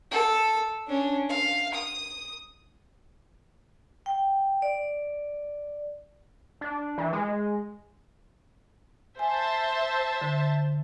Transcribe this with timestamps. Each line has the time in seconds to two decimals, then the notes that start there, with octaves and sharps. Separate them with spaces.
0.11 A4
0.88 C#4 D4
1.29 F5
1.74 D#6
4.06 G5
4.62 D5
6.61 D4
6.98 E3
7.13 G#3
9.19 C5 E5 G#5 A5
10.21 D3